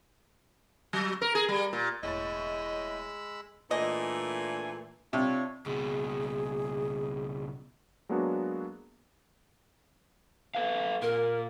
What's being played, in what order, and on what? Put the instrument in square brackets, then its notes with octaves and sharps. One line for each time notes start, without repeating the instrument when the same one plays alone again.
[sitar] F#3
A#4
G#4
G3
A#2
[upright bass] E1 [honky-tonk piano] A2 C#5 A6 [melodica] G#3 B5 E6 [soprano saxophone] D#5
[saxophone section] A#2 E3 A3 [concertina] D4 G#5 [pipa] D#5
[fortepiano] C3 [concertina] D4 F4 C#5
[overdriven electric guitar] C#2 B2 [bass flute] G#4
[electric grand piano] F#3 G#3 A#3 B3 D4 F#4
[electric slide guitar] A4 B4 F5
[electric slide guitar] A#2 [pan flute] A#4